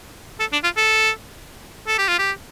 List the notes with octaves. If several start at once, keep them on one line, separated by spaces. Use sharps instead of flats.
A4
D4
F4
A4
A4
G4
F4
G4